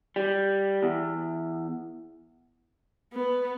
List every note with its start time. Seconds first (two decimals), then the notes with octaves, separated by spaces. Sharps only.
0.16 G3
0.83 E2
3.13 B3